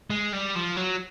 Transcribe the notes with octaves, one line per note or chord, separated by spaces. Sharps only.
G#3
G3
F3
F#3